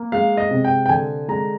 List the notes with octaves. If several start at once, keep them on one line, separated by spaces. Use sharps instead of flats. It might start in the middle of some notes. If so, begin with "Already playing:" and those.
Already playing: A#3
G#3 F5
D#5
C3
G5
G5
D3 G#5
G#3 A#5